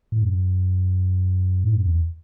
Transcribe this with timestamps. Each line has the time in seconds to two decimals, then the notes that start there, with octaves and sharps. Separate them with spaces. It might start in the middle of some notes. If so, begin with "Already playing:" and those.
0.12 A2
0.22 F#2
1.64 A2
1.75 F#2
1.86 E2